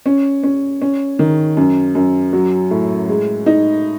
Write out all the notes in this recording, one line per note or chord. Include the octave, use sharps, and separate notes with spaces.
C#4
C#4
C#4
D#3
F#2
F#2
F#3
A2
G#3
D#4